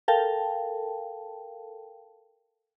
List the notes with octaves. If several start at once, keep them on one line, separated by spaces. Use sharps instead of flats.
A4 A#4 F5 G5 A5